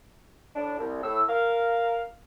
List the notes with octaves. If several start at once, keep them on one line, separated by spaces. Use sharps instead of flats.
A2 D4
C2
A2 E6
A#4 F5